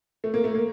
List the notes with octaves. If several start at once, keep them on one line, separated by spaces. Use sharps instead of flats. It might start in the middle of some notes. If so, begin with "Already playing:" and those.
A3
A#3
A3
A#3